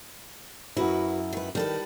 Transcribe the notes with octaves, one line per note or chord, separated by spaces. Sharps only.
F#2 E4 F#4 B4
D#3 B4
D#3 G3 A4 B4